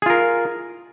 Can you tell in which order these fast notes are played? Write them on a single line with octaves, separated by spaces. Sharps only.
G#4 F4 A#4